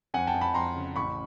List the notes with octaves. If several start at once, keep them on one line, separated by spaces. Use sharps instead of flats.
F2 F#5 G#5
G5 A5
F2
A5 B5
F2 A#5 C6
C#3
A1 B5 C#6